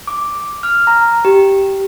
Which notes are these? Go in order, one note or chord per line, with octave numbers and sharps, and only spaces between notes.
D6
F6
A#5
G4